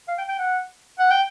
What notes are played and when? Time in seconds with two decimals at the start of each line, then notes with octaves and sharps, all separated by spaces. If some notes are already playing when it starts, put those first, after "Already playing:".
0.08 F5
0.18 G5
0.29 G5
0.39 F#5
0.99 F#5
1.11 G5